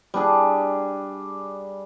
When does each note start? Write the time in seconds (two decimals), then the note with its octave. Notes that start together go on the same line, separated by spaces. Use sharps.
0.14 G3 D4 G#4